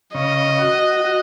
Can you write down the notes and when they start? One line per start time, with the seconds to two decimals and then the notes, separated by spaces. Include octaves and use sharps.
0.14 C#3 D#5
0.59 F#4
1.04 F#4